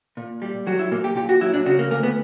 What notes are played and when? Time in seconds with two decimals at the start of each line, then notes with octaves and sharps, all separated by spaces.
0.17 A#2
0.42 G3
0.67 F#3 F#4
0.79 E4
0.91 A#2 A#3
1.04 G4
1.16 A#2 G4
1.29 F#4
1.41 F#3 E4
1.54 D4
1.66 C#3 F#4
1.79 A#3
1.91 D2 A#3
2.03 B3